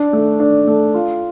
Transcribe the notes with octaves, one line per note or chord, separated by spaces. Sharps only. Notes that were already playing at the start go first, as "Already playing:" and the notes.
Already playing: D4
A3
D4
A3
F4